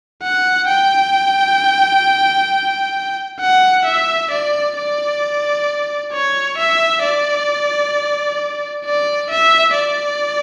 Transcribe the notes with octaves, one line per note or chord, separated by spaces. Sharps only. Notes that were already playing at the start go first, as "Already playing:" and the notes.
F#5
G5
F#5
E5
D5
D5
C#5
E5
D5
D5
E5
D5